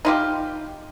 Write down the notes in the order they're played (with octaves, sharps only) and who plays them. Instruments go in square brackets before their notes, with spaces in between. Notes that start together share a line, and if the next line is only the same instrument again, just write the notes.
[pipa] D#4 F4 G4